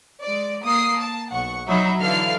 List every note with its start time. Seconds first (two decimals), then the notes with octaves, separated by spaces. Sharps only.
0.22 G#3 D5
0.64 A#3 D#6 C7
1.00 A5
1.31 B1 F#5 C#6
1.68 F#3 D#4 E5 B5
2.00 D3 E3 A4 F5 F6 C7